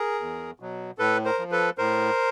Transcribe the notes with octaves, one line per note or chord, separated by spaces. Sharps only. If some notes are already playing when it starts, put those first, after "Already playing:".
Already playing: G#4 A#4
E2
B2 F#3
A2 A4 B4
A#4 C5
F3
A4 B4
A2 A#4 C5